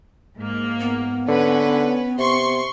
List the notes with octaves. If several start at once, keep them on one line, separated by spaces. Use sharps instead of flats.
G#2 A#3
B3
D3 C#4 B4
C3 C6 C#6